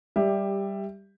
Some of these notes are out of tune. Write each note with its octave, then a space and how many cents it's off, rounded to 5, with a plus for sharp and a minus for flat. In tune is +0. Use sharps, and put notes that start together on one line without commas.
G3 +0 G4 +15 E5 +0